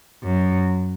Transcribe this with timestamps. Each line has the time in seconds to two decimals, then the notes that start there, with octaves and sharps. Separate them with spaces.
0.23 F#2